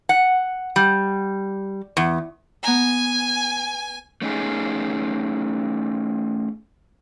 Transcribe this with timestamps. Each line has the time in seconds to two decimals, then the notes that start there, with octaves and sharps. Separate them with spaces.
0.09 F#5
0.76 G3
1.97 E2
2.63 B3 G#5 A#5
4.22 A3 C#4 D#4 G#4